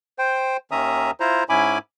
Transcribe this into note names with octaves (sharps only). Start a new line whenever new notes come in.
C5 G5
D#2 D#3 C#4 E5 A#5 D#6
E4 F4 C5 A#5
G#2 C#4 E4 G#5 B5 D6